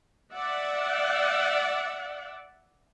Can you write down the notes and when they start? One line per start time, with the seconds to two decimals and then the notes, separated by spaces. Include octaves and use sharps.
0.34 D5 E5 F#5